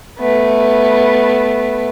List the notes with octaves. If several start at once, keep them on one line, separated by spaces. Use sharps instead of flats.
A3 B3